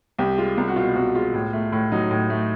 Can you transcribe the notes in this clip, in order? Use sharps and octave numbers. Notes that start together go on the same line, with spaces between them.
C2 G4
G#3 F4
C2
F#4
B2 F4
C2 F#4
G#3 F4
A2
A3
A2
F#3 D#4
A2
A3